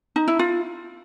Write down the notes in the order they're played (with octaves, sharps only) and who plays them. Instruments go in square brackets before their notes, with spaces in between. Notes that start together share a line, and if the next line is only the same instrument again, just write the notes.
[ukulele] D#4
E4
F4